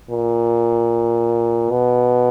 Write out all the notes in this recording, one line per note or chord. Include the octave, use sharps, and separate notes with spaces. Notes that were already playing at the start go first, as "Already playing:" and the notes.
A#2
B2